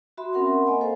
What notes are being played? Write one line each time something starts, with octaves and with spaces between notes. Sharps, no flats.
F#4 E5 B5 C6
C4 C#4 A#4 F#5 B5 C6
A#3 D#5 G#5
A4 C5 F5